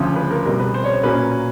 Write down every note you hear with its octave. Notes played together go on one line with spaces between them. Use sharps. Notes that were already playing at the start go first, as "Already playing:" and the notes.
Already playing: D2 C#3 F3
B4
A#4
C2 B2 G3 A#4
B4
C5
C#5
C5
A#2 F#3 A#3 C#4 B4